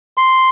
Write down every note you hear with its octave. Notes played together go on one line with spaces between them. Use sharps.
C6